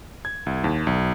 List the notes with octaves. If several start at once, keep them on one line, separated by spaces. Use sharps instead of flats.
G#6
C2
D#2
B1